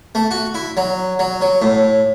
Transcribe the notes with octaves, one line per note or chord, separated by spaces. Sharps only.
A3
F#4
E4
F#3
F#3
F#3
A2